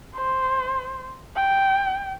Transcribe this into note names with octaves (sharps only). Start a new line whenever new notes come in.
C5
G5